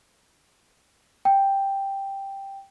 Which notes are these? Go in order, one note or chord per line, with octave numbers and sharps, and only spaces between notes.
G5